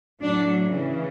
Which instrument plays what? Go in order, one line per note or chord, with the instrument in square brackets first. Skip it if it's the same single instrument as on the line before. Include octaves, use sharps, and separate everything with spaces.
[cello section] A2 F#3 D4
C#3 E3